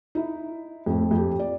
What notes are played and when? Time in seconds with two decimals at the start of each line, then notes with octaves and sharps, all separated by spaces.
0.15 D#4 E4
0.86 F2 A2
1.11 F2 G4
1.39 D5